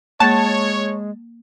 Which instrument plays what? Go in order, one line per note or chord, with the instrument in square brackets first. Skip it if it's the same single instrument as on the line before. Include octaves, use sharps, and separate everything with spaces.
[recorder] G#3 [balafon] A#3 [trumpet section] C#5 [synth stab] A5